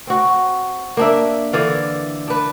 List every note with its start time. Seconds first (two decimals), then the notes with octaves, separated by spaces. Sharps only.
0.07 C4 F#4
0.97 A#3 D4 E5
1.53 D3 E3 D5 F5
2.28 D4 B4